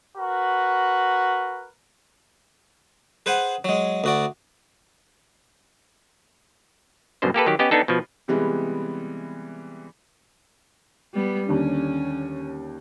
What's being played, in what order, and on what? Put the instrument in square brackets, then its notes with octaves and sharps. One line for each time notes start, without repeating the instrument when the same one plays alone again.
[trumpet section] F#4 A#4 B4
[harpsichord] G#4 B4 C5 F#5
F#3 G#3
D2 F#4 D5
[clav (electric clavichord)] C2 F#2 B2 D3 C5
A#3 G4 A4 B4
D#3 F#3 G4
B3 C#4 G4 D#5
B3 D4 D#4 A4
B2 F3
[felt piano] C3 E3 G3 G#3 B3
[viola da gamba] G3 B3
[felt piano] D#2 D3 [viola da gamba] C#4